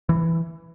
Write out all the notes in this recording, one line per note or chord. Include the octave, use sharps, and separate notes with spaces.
E3